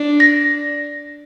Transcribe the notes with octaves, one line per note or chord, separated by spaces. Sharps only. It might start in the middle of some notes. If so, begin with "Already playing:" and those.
Already playing: D4
A#6